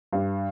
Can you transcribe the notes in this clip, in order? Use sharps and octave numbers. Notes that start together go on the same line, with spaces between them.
G2